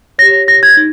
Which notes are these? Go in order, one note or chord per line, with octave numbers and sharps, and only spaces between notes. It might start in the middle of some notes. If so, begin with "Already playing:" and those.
G4 C#5 A#6
A#6
G#6
D#4